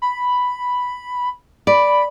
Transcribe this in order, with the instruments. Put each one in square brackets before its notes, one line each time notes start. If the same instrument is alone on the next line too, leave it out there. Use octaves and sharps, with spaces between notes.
[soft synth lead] B5
[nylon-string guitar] D5 [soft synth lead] B5